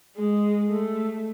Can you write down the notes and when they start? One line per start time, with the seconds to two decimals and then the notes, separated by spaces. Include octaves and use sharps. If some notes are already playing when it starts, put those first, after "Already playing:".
0.16 G#3
0.69 A3